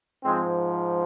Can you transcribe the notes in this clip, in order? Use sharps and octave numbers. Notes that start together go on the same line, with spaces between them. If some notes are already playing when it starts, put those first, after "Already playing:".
G#2 F3 G#3 C4